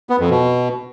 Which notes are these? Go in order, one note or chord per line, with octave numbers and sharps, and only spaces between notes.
B3
F2
B2